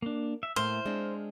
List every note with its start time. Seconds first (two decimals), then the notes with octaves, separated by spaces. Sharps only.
0.02 A#3 D4
0.43 E5
0.56 A2 A3 A#3 C5 F6
0.85 G#3 C4 D4